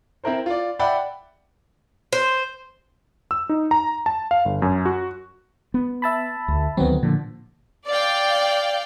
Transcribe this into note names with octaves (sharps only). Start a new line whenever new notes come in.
C4 E4 A#4 C5
F4 D5
D5 E5 F#5 G5 B5
C5
E6
D#4
A#5
A5
F5
G1
F#2
F#4
B3
E5 A5 B5
D2
D2 D#3 F#3 B3 C4
A#2 D3 F3
D5 F5 G5